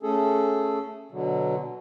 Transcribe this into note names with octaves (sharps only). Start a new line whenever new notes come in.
A3 C#4 G#4 A4
B2 D3 F#3